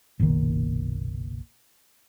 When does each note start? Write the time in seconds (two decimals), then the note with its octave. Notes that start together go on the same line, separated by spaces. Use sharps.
0.19 F#1 B1 A#2 D#3